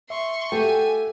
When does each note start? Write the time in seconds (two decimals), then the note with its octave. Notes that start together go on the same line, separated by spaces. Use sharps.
0.10 E5 C6 C#6
0.52 A3 F#4 G4 A4 G5 G#5